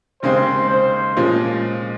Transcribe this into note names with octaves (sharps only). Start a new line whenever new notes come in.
D#2 C#3 G#3 C4 C5
C5
A#2 F3 G#3 C#4